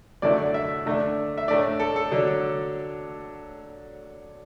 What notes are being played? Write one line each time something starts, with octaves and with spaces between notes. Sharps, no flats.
F#2 D3 A3 E4 D5
D5
E5
D3 A3 D4
E5
A2 A3 D4 D5
A4
A4
D3 F#3 D4